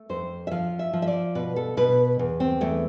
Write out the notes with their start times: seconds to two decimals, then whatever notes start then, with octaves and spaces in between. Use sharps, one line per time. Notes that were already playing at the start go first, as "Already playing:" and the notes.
Already playing: A3
0.09 F2 C5
0.47 E5
0.51 F3 F5
0.79 E5
0.93 F3
1.02 E5
1.07 D5
1.35 B2 B4
1.56 A4
1.77 B2 B4
2.19 E2
2.40 C4
2.61 E2 A3